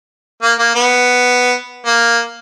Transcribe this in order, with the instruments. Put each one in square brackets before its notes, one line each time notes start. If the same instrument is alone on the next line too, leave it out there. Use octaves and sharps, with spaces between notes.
[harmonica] A#3
A#3
B3
A#3